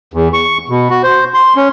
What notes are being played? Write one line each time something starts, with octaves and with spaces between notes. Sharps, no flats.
E2
C#6
B2
F#4
C5
C6
C#4